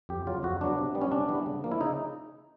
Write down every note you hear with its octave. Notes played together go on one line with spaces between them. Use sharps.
F2 G4
C#3 F#3 B3 F4
F2 F#4
C#3 F#3 B3 D4
C3
E3 G3 B3
C#4
C3 D4
E3 G3 B3
C#3
F3 A#3
E4
C#3 D#4